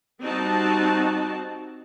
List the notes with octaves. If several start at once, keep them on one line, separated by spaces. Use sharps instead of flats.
G3 C4 D#4 F#4 A5